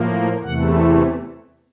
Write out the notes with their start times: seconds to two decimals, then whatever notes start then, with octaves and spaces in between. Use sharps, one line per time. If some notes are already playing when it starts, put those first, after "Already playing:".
Already playing: A2 F3 A#3
0.42 E2 C3 E3 A3 F#5